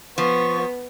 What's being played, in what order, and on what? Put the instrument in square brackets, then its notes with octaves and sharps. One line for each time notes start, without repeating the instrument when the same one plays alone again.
[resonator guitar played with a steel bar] F3 [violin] B3 [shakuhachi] C#6